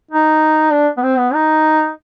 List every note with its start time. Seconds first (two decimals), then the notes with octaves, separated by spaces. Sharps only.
0.11 D#4
0.72 D4
0.97 B3
1.03 C4
1.18 B3
1.34 D#4